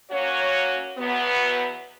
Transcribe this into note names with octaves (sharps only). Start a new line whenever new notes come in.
F#3 A#3 C#4 F#4 C#5
E2 B2 F#3 B3